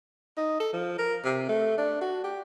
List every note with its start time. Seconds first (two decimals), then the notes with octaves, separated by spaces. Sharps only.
0.37 D#4
0.60 A4
0.73 F3
0.98 A#4
1.24 C3
1.49 A3
1.78 D4
2.01 F#4
2.24 G4